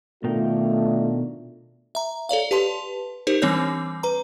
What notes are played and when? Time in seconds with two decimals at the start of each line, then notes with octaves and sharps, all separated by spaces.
0.24 B2 D#3 A3 D4 F4 A#4 G5
1.95 E5 A#5
2.29 A4 C#5 D5 F5
2.51 G4 B4 A5 C6
3.27 D#4 G4 A#4 C5
3.42 E3 G3 C4 D4 C#5 G6
4.03 B4 A#5